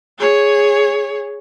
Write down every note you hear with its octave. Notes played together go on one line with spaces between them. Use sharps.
G#4 C#5